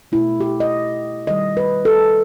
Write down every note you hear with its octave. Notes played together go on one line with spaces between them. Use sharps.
B2 A3 E4
G4
D#5
D#3 G3 D#5
B4
A4